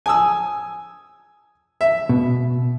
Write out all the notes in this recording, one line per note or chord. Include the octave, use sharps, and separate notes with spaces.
G#5 D#6 E6
E5
B2